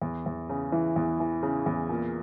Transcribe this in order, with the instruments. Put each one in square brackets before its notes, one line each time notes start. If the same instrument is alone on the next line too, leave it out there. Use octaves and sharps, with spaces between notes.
[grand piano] E2
E2
C#3
E3
E2
E3
C#3
E2
A#2